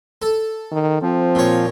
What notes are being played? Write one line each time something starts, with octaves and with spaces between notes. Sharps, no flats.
A4
D#3
F3 C4
A#2 C#5